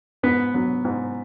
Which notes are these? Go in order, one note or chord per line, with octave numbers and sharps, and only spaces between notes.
G#2 B3 B4
F#3 B3
G#2